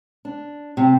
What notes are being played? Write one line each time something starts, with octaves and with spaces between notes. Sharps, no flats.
D4
C3